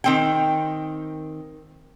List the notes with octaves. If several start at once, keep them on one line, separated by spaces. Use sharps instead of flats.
D#3 C4 G5